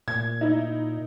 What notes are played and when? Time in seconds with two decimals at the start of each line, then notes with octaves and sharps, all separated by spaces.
0.08 A#2 G#6
0.41 D#4 E4